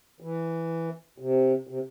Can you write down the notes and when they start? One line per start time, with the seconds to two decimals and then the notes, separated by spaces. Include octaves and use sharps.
0.20 E3
1.18 C3
1.67 C3